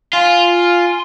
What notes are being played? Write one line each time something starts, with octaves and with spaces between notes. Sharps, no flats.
F4 G#5 C6